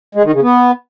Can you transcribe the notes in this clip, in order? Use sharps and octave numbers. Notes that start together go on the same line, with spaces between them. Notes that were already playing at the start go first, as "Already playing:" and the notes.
G#3
D#3
C#3
B3